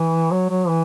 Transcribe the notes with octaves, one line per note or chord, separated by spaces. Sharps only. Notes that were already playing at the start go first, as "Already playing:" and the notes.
Already playing: E3
F#3
F#3
E3